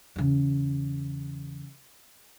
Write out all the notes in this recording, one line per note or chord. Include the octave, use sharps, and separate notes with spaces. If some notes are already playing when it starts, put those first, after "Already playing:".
E2 C#3